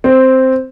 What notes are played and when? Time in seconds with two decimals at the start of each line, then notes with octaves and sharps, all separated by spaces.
0.04 C4